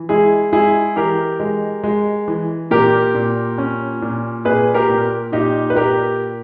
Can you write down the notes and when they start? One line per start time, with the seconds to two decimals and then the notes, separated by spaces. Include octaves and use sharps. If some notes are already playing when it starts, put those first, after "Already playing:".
Already playing: E3
0.09 G#3 E4 G#4
0.53 G#3 E4 G#4
0.96 E3 G4 A#4
1.40 G#3
1.83 G#3
2.28 E3
2.71 A#2 G4 A#4
3.15 A#2
3.58 C#4
4.02 A#2
4.45 A#2 G#4 B4
4.74 G4 A#4
4.89 A#2
5.32 A#2 D#4 G4
5.70 B4
5.76 A#2 G4 A#4